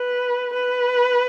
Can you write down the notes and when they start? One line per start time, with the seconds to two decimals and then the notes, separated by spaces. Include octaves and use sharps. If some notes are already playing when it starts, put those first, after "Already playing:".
Already playing: B4
0.53 B4